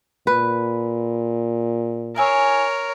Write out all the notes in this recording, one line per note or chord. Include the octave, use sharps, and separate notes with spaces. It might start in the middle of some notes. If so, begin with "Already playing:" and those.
A#2 B4
E4 G#4 A#4 C#5 E6